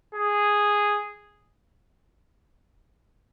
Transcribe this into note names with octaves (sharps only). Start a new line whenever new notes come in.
G#4